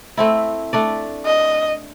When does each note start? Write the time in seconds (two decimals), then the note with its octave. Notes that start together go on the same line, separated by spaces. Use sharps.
0.17 A3 C4 E4
0.73 A3 D4 D5
1.26 D#5